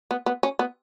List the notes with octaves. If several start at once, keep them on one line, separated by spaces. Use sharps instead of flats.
B3
B3
C#4
B3